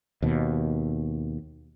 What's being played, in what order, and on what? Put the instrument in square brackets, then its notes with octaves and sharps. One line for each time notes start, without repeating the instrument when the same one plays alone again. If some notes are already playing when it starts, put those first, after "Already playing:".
[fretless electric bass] D#2 B2